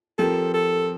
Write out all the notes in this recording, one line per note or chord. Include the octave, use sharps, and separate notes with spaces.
F3 C4 G4 A4 A#4
A4